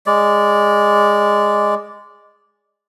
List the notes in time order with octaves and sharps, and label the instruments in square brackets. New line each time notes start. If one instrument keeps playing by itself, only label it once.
[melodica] G#3 D5